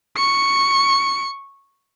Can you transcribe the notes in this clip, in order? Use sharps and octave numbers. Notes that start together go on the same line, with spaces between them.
C#6 C#7